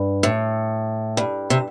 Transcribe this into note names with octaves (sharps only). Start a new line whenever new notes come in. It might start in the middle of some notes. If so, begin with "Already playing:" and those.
Already playing: G2
A2
G2
C3